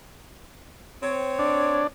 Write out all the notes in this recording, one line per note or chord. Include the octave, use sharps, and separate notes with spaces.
C4 C#5
D4